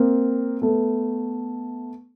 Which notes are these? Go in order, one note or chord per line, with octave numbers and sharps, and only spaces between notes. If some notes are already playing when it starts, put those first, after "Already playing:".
Already playing: A#3 C4
A3 B3